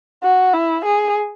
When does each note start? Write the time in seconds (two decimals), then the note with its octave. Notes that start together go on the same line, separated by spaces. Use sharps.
0.23 F#4
0.53 E4
0.85 G#4